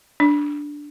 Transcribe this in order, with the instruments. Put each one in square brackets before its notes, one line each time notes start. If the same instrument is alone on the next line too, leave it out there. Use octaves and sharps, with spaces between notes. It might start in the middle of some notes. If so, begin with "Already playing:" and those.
[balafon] D4